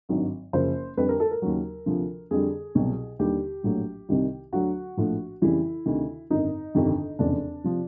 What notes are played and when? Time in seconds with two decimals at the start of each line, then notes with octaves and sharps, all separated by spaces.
0.09 G#1 G2 D#3 F#3
0.53 F#1 F#2 C#3 F3 C5
0.97 F2 D3 G3 B4
1.09 A#4
1.20 A4
1.31 A#4
1.42 D#2 C#3 F#3
1.86 D2 C3 F3
2.31 F2 D3 G3 G#4
2.75 C2 B2 F#3
3.19 D#2 D3 G3 G4
3.63 A#1 A2 F#3
4.09 C2 C3 D#3 G3
4.52 D2 D3 F#3 F#4
4.97 A#1 A2 F3
5.42 F2 C#3 E3 G3 E4
5.86 D2 C3 D#3
6.30 G#1 F#2 D3 D#4
6.74 G1 F2 C3 D#3 G3
7.19 F1 E2 C#3 D4
7.64 C3 F3